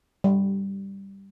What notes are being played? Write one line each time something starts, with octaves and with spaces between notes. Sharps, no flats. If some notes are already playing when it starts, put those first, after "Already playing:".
G3